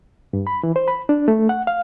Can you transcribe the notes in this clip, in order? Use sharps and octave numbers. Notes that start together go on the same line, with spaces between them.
G2
B5
E3
C5
B5
D4
A3
F#5
F5